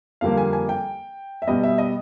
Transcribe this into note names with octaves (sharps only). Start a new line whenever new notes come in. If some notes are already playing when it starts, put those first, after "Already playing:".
F2 D3 G3 A#3 F5
G#5
G#5
G5
E5
B2 G3 B3 D#5
E5
D#5